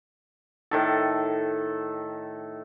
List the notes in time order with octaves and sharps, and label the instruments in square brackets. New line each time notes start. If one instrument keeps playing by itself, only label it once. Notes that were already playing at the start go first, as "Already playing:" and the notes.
[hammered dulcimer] A2 D#3 A4